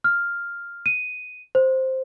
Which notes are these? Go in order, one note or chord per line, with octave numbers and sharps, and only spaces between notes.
F6
D#7
C5